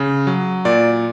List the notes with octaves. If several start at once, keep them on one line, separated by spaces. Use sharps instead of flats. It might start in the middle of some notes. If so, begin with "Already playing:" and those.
Already playing: C#3
F#3
A#2 D5